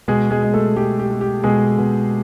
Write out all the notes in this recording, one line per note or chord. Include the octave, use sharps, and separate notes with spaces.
B2 G#3 G#4
G#3 G#4
G#3
A3 A4
G#3 G4
G4
G#3
G4
B2 G#3 G#4
B2